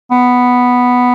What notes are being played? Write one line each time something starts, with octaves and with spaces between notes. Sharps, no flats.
B3